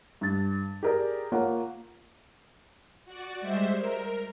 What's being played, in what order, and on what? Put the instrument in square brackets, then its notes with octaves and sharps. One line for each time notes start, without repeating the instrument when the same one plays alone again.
[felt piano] G2 A6
G4 G#4 A#4 D5
A#3 F4 C#5 F#5
[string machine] F#4 D5
G3 G#3 C5 E5
A#4